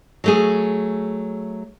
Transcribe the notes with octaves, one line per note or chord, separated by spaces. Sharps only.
F#3 A3 G#4